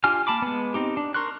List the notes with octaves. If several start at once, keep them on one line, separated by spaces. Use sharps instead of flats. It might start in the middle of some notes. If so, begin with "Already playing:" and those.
D4 F4 G4 G#5 F6
A#3 A5 B5 D6
G#3 B3
C4 D#4 G4
D4
A#4 C6 C#6 F#6